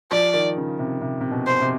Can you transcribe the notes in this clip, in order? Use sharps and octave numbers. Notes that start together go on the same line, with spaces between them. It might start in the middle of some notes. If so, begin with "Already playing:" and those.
F3 D5
D#3
C#3
C3
C3
C3
B2
C5
C3